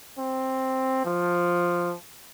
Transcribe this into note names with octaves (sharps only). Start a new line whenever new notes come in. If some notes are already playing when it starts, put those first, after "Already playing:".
C4
F3